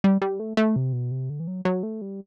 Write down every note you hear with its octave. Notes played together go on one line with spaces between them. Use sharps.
G3
G3
A3
A3
C3
B2
C3
D3
E3
F#3
F#3
A3
G3